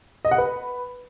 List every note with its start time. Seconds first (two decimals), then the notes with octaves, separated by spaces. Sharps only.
0.25 D#5
0.31 F#5
0.38 B4